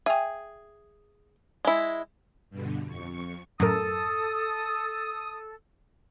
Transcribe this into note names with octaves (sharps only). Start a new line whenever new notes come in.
G#4 E5 G5
G#3 E4
G2 B2 D3
F2 C#6
F#2 A2 A4 A#4 D#6